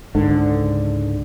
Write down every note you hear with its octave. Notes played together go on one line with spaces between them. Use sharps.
C#2 G#2 D3